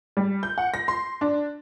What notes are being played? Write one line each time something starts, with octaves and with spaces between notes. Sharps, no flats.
G3
G6
F#5
A#6
C6
D4